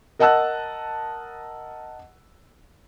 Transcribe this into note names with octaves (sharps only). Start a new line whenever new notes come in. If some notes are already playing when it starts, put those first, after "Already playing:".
A#4 D#5 F#5 A5 E6 F#6